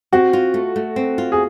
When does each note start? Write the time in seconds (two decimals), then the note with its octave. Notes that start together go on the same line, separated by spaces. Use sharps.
0.13 C4 F#4
0.33 F4
0.54 A3
0.76 A3
0.96 C4
1.18 F4
1.32 G#4